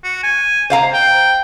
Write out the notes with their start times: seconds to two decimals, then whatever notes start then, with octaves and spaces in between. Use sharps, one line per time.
0.04 F#4
0.23 G#5
0.70 C5 F5 A#5
0.93 G5